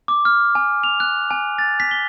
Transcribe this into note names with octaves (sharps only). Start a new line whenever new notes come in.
D6
F6
G#5
F7
F#6
G#5
A6
B6
G7